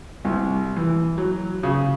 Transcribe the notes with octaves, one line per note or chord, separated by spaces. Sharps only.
C2
E3
F#3
C#3